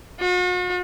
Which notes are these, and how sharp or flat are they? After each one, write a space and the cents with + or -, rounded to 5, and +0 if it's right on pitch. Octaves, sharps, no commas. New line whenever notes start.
F#4 -45